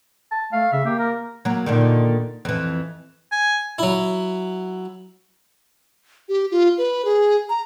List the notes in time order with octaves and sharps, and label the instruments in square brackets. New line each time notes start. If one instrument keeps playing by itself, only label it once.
[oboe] A5
[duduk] A3 [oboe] F5
[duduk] C#3 [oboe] E5
[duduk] A#3 [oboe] G4
[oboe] A#4
[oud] F#3 A#3
A#2 D3 D#3
F2 E3
[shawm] G#5
[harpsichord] F#3 E4
[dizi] G4
F4
B4
G#4
A#5